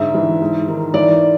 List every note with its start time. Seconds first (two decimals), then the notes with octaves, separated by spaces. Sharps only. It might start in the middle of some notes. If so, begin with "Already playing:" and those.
Already playing: G#2 D3 E5
0.14 E3
0.41 G#2
0.68 D#3
0.94 E3 D5